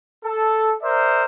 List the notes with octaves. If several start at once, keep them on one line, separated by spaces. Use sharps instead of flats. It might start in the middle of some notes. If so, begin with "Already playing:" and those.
A4
A#4 C5 D5 E5